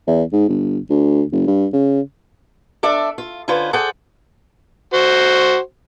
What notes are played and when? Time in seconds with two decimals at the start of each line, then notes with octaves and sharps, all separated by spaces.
0.07 E2
0.32 G#2
0.48 G1
0.90 D2
1.32 F#1
1.47 G2
1.73 C#3
2.83 D4 A4 D5 E5
3.18 F4
3.48 D3 C#4 F4 B4 C5
3.73 G#4 A4 C5 D5 F#5 G5
4.93 F#4 C5